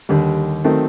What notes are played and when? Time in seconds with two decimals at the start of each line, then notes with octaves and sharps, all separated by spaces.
0.09 D#2 D3 G3
0.64 D#3 F#3 A3 C4